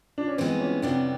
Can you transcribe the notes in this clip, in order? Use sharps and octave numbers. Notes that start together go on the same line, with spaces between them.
D4
C#4
G2 E3 G#3 B3 C4
C#4
F2 C3 E3 G3 B3 D4